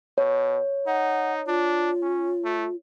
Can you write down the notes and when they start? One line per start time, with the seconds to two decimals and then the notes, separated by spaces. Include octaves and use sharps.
0.18 B2 C#5
0.87 D#4 F#5
1.47 D4 F4
2.02 C#4
2.44 A3